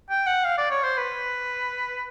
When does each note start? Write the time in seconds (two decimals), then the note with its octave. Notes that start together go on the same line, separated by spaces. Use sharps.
0.10 G5
0.27 F#5
0.45 F5
0.58 D5
0.71 C#5
0.84 C5
0.97 B4